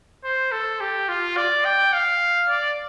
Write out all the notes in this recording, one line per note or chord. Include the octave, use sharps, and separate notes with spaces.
C5
A4
G4
F4
D5
G5
F5
D5